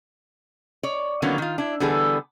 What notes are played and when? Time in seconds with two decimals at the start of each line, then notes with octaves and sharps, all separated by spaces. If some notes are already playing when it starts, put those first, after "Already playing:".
0.83 C#5 D5
1.22 D3 D#3 F#3 A#3 B3 C#4
1.38 D#3 F4
1.58 D4 E4
1.80 D3 E3 G3 B3 G#4 A4